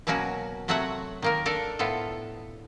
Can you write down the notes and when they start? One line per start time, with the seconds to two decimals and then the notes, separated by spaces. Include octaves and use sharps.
0.07 B2 F#3 A#3 C#4 F#4
0.68 C3 F#3 A3 F#4 C#5 F#5
1.22 D#3 A#3 A#4
1.45 D4 A4 A#4
1.79 A2 B3 F4 A4